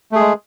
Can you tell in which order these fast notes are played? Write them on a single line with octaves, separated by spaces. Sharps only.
A3 G#4 G#3